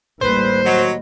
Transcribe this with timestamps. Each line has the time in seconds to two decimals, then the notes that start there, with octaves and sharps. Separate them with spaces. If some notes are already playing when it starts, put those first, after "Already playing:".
0.21 A1 D#2 G3 B4 C5
0.65 F#3 D#5